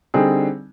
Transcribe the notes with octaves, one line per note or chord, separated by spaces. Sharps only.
D3 G3 C4 D#4 G#4